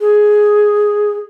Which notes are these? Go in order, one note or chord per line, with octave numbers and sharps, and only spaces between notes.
G#4